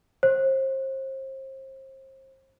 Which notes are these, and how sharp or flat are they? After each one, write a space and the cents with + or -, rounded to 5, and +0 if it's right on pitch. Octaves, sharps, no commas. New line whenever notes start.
C5 +30